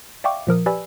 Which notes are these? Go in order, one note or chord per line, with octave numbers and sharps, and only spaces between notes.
D5 E5 F5 G5 C#6 D6
A#2 F3 A#4 D#6
G4 B4 D5 G#5 B5 E6